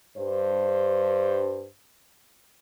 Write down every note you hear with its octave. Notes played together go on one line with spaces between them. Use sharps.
G2 C5